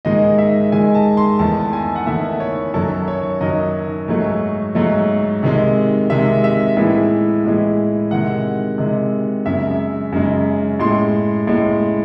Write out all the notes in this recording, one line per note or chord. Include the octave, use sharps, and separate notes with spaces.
G#2 D#3 G#3 D#5
E5
G#2 D#3 G#3 G#5
A5
C6
E2 D#3 A3 A5
G#5
F#5
E2 D#3 A3 E5
C#5
F#2 D#3 F#3 A4
C#5
F#2 D#3 F#3 D#5
G#2 F#3 A3
G#2 F#3 A3
C3 D#3 G#3
C3 D#3 G#3 E5
E5
A2 E3 G#3 E5
A2 E3 G#3
C3 D#3 G#3 F#5
C3 D#3 G#3
F#2 C#3 G#3 E5
F#2 C#3 G#3
A2 G#3 C6
A2 G#3